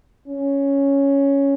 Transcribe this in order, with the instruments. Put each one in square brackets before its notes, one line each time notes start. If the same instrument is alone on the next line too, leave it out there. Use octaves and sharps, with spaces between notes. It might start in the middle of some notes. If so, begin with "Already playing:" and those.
[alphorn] C#4